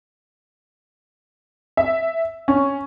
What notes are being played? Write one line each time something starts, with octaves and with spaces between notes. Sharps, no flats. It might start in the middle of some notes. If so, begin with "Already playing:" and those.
E5
C#4